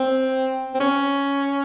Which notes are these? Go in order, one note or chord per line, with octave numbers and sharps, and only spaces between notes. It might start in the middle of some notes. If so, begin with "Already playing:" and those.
Already playing: C4
C4
C#4